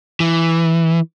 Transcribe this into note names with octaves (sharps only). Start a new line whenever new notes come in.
E3